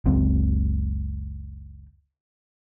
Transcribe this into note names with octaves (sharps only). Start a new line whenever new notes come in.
F#1 C#2 C4